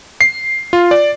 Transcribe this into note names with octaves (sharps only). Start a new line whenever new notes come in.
C7
F4
D5